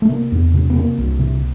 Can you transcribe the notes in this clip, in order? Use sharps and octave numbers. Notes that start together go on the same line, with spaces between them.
A3
C3 A#3
E2
C3
B3
C3 A#3
C2
C3